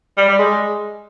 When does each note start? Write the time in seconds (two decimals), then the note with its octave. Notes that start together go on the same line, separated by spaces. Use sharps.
0.17 G3
0.28 G3
0.39 G#3